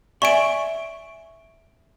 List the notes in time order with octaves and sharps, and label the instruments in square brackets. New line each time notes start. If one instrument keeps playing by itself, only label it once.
[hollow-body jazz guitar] D5 E5 G#5 [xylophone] C#6 D7